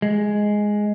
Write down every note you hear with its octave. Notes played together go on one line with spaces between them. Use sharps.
G#3